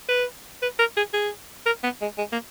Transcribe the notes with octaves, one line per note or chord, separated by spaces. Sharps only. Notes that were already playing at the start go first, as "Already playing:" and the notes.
B4
B4
A#4
G#4
G#4
A#4
B3
G#3
G#3
A#3